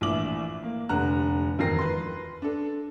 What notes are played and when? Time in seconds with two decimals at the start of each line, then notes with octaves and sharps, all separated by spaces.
0.01 A#1 A2 E3 E4 D6 F#7
0.63 A#3
0.89 F1 D3 F#5 A#5 F#6
1.59 E1 F2 D#3 A#4 A#6 C7
1.79 B4 C6
2.42 D4 A4